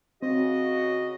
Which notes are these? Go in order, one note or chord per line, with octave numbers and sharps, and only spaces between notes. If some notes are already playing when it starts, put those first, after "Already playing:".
C#3 C4 F#4 D#5